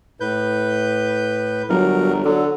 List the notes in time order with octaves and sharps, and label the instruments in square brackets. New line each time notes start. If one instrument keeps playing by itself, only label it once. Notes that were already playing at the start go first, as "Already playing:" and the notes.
[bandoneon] A2 B4 G6
[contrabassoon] G1 [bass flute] F#3 [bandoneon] A#4
[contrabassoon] D3 [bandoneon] F#3 [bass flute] A4